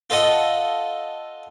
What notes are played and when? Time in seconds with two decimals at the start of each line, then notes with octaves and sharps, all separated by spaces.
0.10 F4 A4 D#5 F#5